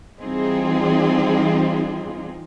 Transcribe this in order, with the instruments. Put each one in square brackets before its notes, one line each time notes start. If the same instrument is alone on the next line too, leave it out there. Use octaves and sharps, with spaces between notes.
[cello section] E3 G3 C4 D#4 F4 G#4